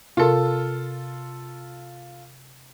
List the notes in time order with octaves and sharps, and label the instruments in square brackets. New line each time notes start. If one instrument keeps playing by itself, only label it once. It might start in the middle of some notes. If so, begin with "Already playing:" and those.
[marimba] C3 A#4 [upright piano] F4 A4